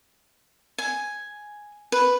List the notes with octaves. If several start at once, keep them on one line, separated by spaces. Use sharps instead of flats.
G#5
B4